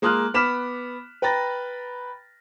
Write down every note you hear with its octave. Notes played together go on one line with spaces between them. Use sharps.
G#3 A#3 C6 D#6 F6 F#6
B3 B5 D6 F6 B6 E7
B4 G5 A#5 B5 A6 A#6